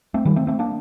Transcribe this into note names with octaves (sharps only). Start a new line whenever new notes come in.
A3 C4
D#3 G3
A3 C4
A3 C4
A#3 D4